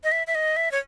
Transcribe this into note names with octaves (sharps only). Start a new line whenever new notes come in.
D#5
E5
E5
D#5
E5
C#5